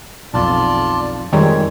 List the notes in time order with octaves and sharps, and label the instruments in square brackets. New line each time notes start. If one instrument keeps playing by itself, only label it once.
[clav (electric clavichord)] B1 F2 [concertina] F4 D5 A5
[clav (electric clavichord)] F2 G#3 C4 [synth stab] D#3 G3 A#4 [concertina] C#5